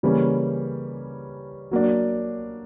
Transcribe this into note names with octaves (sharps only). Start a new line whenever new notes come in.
C#3 E3 G3 A#3 C#4
F#3 A#3 D4